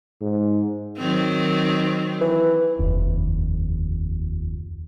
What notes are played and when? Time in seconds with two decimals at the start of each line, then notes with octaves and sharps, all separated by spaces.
0.22 G#2
0.98 D#3 F#3 C4
2.21 E3
2.79 F1 D#2